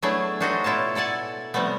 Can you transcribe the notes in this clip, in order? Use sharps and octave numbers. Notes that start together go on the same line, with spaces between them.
F#3 A3 B3 D4 E4 G#4
D4 D#4 F#4 G4 C5 D#5
B2 E4 F4 C#5 A5
E4 A4 D5 F#5 G#5
C3 F3 G3 A3 B3